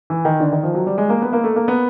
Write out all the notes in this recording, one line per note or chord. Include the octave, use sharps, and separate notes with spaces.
E3
D#3
D3
D#3
F3
F#3
G3
G#3
A#3
B3
A#3
A3
A#3
B3